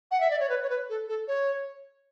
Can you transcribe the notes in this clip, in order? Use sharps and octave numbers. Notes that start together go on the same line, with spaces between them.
F#5
E5
D5
C#5
B4
C#5
B4
A4
A4
C#5